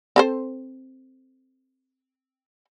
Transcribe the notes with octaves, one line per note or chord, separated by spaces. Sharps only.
C4 A4 C5